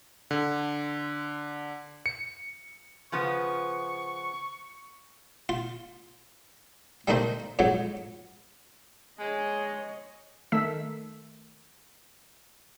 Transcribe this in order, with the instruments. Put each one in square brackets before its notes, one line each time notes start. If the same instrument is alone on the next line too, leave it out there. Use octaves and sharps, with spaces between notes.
[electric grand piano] D3
C#7
[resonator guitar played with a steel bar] C#3 F3 B3 [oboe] C#6
[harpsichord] F4
G3 A3 A#3 D#4 A#4 C5
F2 G#2 F#3
[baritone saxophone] G#3 [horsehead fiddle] C#5 D#5
[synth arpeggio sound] D#3 A3 E6 B6